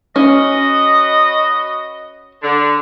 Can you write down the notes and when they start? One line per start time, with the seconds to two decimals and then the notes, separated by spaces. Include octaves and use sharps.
0.16 C#4 F#4 B4 D#5
2.43 D3